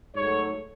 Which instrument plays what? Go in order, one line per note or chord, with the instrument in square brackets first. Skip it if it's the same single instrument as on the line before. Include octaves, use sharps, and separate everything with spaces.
[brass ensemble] G#2 F#3 A3 C#5